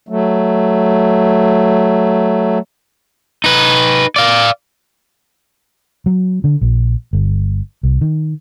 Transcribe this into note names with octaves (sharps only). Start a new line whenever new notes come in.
F#3 A3
D#4 B4
D5 F5
F#3
D3
A#1
G1
C2
D#3